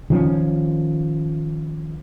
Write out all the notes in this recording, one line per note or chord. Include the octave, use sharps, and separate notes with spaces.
D#3 F3 C4 C#4